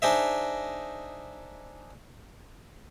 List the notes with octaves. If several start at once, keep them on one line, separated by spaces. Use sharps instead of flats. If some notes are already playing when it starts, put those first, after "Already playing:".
D4 D#4 G#4 C5 D#5 E5